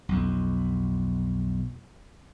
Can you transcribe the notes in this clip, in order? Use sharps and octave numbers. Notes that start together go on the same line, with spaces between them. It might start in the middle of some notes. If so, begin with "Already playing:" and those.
B1 F2